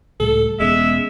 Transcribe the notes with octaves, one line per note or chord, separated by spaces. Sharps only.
C#2 A2 G3 A4
E1 G#3 B3 C#4 E5